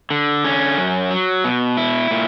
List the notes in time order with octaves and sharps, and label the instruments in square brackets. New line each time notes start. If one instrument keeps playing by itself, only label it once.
[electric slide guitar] D3
C#4
F#2
F#3
B2
E4
A#2